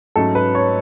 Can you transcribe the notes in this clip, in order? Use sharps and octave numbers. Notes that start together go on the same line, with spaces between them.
G#2 F#3 A3 C#4 A4
B4
C#5